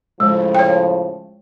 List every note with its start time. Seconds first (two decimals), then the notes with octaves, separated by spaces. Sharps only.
0.20 A2 C#3 F3 G#3
0.55 C#5 G5